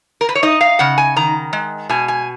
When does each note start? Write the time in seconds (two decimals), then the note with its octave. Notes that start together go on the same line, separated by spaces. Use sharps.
0.21 A#4
0.29 B4
0.35 C#5
0.43 D#4 D#5
0.61 F5
0.79 C#3 F#5
0.98 G#5
1.16 D#3 A#5
1.53 G#3
1.89 B2 G#5
2.08 G#5